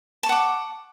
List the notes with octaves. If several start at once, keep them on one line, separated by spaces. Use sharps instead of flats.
F#5 A5 C#6 D6